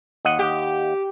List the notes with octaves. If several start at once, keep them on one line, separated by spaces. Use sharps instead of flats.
D#2 D#5 F#5
G4